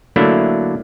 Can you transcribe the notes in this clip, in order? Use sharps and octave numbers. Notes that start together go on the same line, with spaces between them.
D3 F#3 A3 A#3 D4 E4